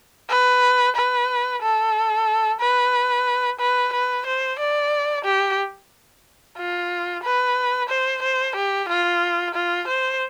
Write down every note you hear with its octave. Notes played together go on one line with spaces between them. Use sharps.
B4
B4
A4
B4
B4
B4
C5
D5
G4
F4
B4
C5
C5
G4
F4
F4
C5